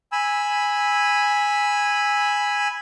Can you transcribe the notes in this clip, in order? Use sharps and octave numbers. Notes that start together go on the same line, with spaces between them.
G#5 B5 E6